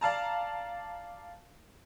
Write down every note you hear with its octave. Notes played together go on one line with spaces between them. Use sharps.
D5 F5 A5 A#5